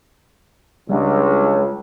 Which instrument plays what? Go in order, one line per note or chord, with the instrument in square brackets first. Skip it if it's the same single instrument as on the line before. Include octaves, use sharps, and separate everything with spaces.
[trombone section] C#2 [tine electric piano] G3 G#3 D4